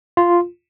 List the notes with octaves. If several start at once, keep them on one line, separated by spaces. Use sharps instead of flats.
F4